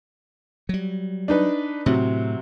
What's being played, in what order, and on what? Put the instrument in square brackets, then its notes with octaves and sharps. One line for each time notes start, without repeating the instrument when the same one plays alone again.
[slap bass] F#3 G3
[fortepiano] D4 D#4 B4
[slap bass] A2 [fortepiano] C3 F#3